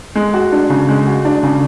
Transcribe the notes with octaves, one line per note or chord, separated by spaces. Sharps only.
G#3
F#4
D4
C#3
G#3
F#4
D4
C#3